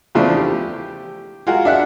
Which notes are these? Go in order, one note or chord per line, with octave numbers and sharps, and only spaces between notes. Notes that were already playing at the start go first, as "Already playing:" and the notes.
E2 C#3 F3 A3 D4
G4
F4 F#4 G#4 A#4
D4 E5 F#5